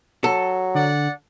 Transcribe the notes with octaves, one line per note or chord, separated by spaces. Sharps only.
F#3 A4
D3 D5 F#5